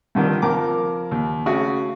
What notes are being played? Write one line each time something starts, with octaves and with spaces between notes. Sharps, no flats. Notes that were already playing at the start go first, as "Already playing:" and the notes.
G2 D3 D#3 F3
F2 A#4 D6
D#2
C#3 A3 F#4